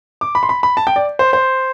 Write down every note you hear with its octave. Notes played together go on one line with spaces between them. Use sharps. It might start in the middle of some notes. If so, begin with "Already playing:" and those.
D6
B5
C6
B5
B5
A5
G5
D5
C5
C5